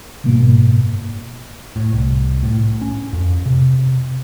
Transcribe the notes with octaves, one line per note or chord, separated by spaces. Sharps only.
F#1 G#2 B2 A#3
A2
C2
A2
C#4
F2
C3